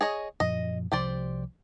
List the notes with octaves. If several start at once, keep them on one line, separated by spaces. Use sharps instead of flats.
G#4 C#5 D#5
F#2 A#2 F3 D#5
C2 C3 F3 G4 C5 D5